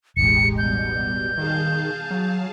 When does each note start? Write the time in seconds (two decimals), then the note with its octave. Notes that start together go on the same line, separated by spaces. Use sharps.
0.17 E1 A1 G#3 D#4 G4 C#7
0.58 B2 G3 G6
1.38 D#3 G#4 F5 A5
2.11 F#3